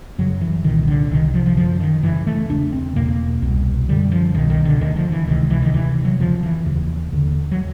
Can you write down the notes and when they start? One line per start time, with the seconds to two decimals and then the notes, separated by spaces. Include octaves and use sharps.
0.18 F#2 C#3 F#3
0.41 E3
0.64 C2 A#2 D#3
0.88 D3
1.11 C2 C3 D#3
1.34 F3
1.46 F3
1.57 F#2 D3 F3
1.80 D#3
2.03 F#2 C#3 E3
2.27 A3
2.50 E2 C#3 D4
2.72 C4
2.95 E2 B2 A#3
3.42 C2 B2
3.88 F#2 D3 G3
4.12 F3
4.35 C2 B2 D#3
4.50 D#3
4.65 D3
4.81 D2 D3 D#3
4.96 F3
5.12 E3
5.27 C#2 C3 D#3
5.50 E3
5.62 D#3
5.74 D2 C3 E3
6.05 F#3
6.20 F2 C#3 F3
6.43 E3
6.66 D#2 C#3
7.13 D#2 D3
7.51 F#3